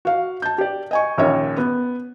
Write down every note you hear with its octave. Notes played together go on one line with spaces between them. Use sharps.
F#4 F5
A5 G6
G4 D5
D#5 G#5 C#6
A#1 D#2 C#4 A#4 C#5 E5
B3